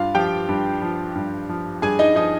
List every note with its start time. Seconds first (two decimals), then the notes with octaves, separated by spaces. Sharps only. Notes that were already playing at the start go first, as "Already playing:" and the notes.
Already playing: G2 F4 F5
0.15 F3 G4 G5
0.49 G2
0.82 F3
1.15 G2
1.49 F3
1.82 G2 G#4 G#5
1.99 D#4 D#5
2.16 F3 D#4 D#5